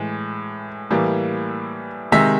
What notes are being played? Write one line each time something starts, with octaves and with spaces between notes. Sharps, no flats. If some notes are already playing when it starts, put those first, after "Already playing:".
Already playing: A2 E3 G#3
A2 E3 G3 A#3
C3 D#3 G#3 E5